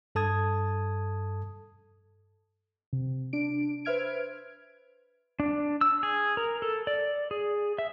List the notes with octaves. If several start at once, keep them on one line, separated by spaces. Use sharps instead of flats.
G2 A4 A5 D#6 G#6
C3
D4 D7
B4 C5 E5 F6 G#6 D7
D4
E6
G#4
A#4
A4
D5
G#4
E5